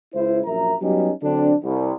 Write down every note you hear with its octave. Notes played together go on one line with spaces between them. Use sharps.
C#2 E4 C5
A#1 F#2 A#4 E5 A#5
F#3 G3 B3 C#4 D#4 G4
D3 F#3 C4 D4
C2